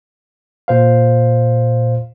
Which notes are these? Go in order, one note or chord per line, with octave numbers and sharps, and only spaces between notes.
A#2 C5 F5